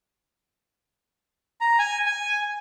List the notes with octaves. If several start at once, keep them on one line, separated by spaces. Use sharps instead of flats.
A#5
G#5
G#5